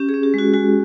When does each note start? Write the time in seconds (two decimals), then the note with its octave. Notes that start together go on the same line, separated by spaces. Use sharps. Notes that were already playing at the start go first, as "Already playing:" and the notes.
Already playing: C#4 G4
0.09 G#4
0.14 C#4
0.23 G4
0.34 G#3 F#4
0.54 G#3 F#4